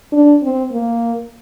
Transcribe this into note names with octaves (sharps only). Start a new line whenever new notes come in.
D4
C4
A#3